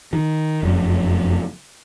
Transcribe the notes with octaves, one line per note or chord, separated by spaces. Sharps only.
D#3
F1 F#2